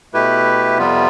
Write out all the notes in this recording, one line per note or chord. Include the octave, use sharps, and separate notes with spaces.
B2 A3 E4 G4 B4
F2 C3 G3 B3 F4